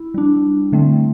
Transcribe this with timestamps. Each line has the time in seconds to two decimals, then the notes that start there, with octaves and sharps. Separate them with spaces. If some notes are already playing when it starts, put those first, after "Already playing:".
Already playing: E4
0.14 G3 D4
0.72 D3 A3 C4